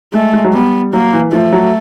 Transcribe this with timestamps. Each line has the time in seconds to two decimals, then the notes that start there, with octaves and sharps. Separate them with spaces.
0.14 G#3 A3
0.33 G#3
0.44 F#3
0.53 G3 B3
0.93 F#3 A#3
1.13 E3
1.32 F3 A3
1.53 F#3